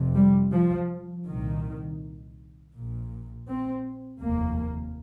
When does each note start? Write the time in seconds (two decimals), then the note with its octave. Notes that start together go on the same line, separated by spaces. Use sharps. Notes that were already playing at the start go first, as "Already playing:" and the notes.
Already playing: F1 F2 C3
0.15 G3
0.52 F3
1.26 C2 A#2 D#3
2.73 A#1 A#2
3.48 C4
4.20 F1 D#2 A#3